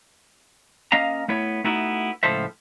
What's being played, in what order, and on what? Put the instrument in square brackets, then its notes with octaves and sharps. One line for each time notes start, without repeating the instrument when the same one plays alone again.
[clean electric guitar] A#3 C#4 D#5 F5 A#5
A3 B3 E4 C#5
A3 B3 D#4 E4 F#4
C#2 A2 F3 A4 C5 E5